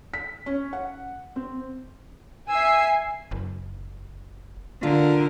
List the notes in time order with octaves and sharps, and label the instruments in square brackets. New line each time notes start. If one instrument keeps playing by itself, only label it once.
[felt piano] B6
C#4
F#5
C4
[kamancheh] E5 E6 [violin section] G#5 C7
[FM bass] F#1
[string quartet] D3 A#4 [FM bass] F4